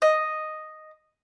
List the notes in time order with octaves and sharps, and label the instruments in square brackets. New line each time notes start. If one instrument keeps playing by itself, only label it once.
[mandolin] D#5